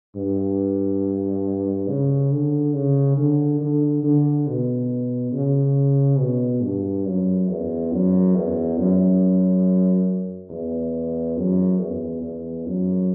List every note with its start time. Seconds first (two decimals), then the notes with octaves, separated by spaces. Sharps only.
0.15 G2
1.88 C#3
2.32 D3
2.74 C#3
3.17 D3
3.61 D3
4.03 D3
4.47 B2
5.32 C#3
6.19 B2
6.62 G2
7.06 F#2
7.49 E2
7.92 F#2
8.35 E2
8.78 F#2
10.50 E2
11.37 F#2
11.80 E2
12.22 E2
12.66 F#2